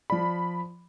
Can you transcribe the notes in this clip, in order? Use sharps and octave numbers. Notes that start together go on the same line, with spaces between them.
F3 D5 B5